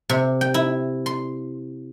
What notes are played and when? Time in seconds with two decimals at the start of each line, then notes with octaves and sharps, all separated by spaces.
0.09 C3
0.41 G5
0.54 E4
1.06 C6